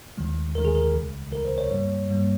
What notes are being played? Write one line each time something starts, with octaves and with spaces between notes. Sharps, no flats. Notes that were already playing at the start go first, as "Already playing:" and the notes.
D#2 D#3 G#3
D#2 D#3 G#3 A#4
G#4
A#4
C#2 C#3 G#3
C#2 C#3 G#3 A#4
C5
C#5
G2 G3 A#3 C#5
G2 G3 A#3